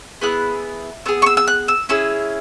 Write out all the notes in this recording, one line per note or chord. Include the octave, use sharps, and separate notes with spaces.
B3 E4 G#4 F#6
B3 G#4 E6
C#6
E6
E6
F#6
E6
C#4 E4 G#4 E6